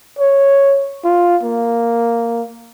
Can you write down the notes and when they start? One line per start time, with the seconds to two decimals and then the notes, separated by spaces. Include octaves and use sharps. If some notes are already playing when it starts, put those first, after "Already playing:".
0.19 C#5
1.05 F4
1.43 A#3